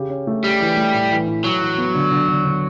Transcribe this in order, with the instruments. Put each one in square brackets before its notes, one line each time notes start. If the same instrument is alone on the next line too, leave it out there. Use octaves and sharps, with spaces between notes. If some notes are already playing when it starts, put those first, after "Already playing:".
Already playing: [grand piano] C#3 G4
C#4
A3
[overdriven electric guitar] G3 [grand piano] G4
[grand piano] E3
A3
A2
E3
A2
[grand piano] A2 [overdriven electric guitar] F#3
[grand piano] E3
B3
D3
D3
D3
D3